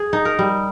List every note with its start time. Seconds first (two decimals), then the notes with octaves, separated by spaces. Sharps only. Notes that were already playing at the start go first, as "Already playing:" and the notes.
Already playing: G#4
0.13 D#4
0.25 A#4
0.39 G3